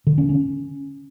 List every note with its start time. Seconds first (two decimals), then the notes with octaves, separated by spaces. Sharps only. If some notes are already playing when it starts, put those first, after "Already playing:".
0.07 D3
0.18 C#4
0.29 C#4